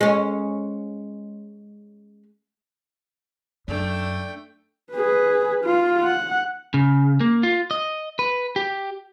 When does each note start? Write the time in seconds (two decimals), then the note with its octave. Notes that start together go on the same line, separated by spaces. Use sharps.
0.01 G#3 C#4
3.68 F#2 A3 D4 G5
4.93 G#4 B4
5.65 F4
6.04 F#5
6.74 C#3
7.20 A#3
7.43 F4
7.71 D#5
8.19 B4
8.56 G4